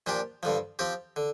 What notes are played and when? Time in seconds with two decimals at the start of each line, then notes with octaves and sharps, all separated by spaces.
0.06 A#2 F3 D4 G4
0.43 G2 D3 F3
0.79 F3 C4 G4
1.16 D3